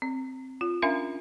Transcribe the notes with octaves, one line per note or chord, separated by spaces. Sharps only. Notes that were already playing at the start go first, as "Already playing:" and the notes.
C4
F4
C#4 D4 A#4 E5 F5 G#5